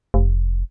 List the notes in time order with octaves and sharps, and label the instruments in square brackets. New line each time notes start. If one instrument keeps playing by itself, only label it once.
[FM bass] F1